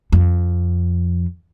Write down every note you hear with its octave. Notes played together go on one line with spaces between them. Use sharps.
F2